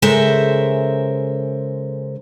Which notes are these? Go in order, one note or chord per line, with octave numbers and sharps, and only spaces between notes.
C#3 G#3 A4 A#4 C5 E5